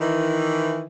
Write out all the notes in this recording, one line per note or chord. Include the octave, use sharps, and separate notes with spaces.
D#3 E3